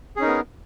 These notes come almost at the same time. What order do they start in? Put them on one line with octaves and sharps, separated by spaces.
G#4 C#4 D#4 A#4 B3